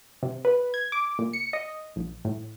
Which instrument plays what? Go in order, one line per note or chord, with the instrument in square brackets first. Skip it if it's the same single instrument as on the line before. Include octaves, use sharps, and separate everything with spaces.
[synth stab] C3
B4
G#6
D6
A#2
C#7
D#5
A#1
A2